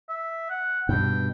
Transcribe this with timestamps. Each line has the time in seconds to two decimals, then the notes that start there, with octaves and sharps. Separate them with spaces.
0.09 E5
0.50 F#5
0.89 G2 B2 G5